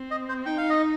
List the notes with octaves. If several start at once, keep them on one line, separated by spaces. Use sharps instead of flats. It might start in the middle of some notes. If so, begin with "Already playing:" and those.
Already playing: C4
D#5
C5
D#4 G5
F5
D#5